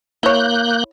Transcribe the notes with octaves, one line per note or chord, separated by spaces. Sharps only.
A#3 E4 C#5 F#6 G6